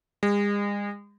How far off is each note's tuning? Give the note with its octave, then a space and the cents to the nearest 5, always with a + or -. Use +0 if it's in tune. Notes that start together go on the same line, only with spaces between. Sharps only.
G#3 -40